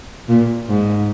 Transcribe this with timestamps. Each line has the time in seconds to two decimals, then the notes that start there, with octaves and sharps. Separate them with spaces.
0.29 A#2
0.69 G#2